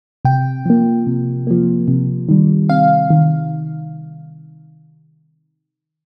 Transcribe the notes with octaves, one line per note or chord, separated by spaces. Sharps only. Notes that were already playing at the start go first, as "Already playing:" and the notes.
C3 G5
F3 A#3
C3
F3 A#3
C3
D#3 G3
C3 F5
D#3